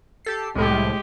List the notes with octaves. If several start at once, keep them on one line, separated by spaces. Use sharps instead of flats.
G4 A4 C7
C2 A2 G#3 G4